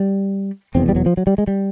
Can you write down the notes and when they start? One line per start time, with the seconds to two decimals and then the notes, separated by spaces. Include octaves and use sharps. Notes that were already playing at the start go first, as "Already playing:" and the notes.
Already playing: G3
0.75 F1 E2 B2 C4
0.89 G3
0.96 F#3
1.06 F3
1.17 F#3
1.27 G3
1.38 G#3
1.47 G3